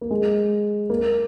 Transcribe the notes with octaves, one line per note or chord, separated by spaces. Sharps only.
A#3
G#3
A#3